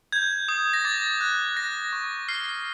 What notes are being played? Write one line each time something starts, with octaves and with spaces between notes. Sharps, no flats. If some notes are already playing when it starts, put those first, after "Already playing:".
G6 G#6
D#6
A#6
D6 A6
F#6
F#6 A#6
C#6
F6 C7